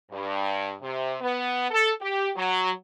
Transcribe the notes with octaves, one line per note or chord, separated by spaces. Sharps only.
G2
C3
B3
A4
G4
F#3